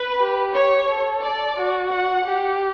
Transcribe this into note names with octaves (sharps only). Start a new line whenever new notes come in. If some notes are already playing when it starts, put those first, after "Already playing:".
Already playing: B4
G4
C#5
A4
D5
F#4
F#5
G4